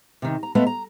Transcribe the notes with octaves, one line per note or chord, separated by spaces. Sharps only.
C3 D#3
A#5
G#3 A3 B3 D#5 F5
A#5